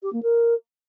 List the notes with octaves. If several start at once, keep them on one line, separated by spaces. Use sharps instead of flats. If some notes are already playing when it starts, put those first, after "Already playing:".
G4
A#3
A#4